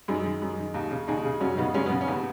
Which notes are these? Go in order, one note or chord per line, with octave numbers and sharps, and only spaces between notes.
F#2 D#4 G#4
D#3
F#2
D#3
D#2
C#3
D#2 D#4 G#4
C#3
F#2 C#4 F#4
C#3 B3 D#4
F#2 G#3 C#4
B3
C#3
C#4
D#2 B3